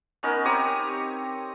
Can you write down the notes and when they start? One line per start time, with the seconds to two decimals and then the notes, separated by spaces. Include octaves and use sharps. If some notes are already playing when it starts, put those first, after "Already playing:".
0.23 B3 C#4 D#4 A#4
0.45 C4 G4 C#5 D#6